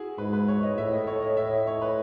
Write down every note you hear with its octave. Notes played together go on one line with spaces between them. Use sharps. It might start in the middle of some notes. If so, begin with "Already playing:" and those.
Already playing: E4 F#4 G#4
G#2 B4
B4
C#5
D#5
A2 E5
D#5
C#5
D#5
E5
D#5
C#5
B4